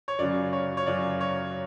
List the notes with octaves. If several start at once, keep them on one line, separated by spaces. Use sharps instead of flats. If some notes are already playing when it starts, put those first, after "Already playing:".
C#5
F#2 C#3 F#3 D5
C#5
C#5
F#2 C#3 F#3 D5
C#5